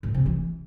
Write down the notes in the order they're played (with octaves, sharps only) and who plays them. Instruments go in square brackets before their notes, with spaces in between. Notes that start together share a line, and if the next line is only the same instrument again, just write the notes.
[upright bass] A#2
C3
E3